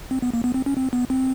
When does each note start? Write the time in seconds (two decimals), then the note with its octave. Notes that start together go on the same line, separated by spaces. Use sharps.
0.11 C4
0.22 B3
0.34 A#3
0.44 B3
0.54 C4
0.66 C#4
0.77 C4
0.93 B3
1.10 C4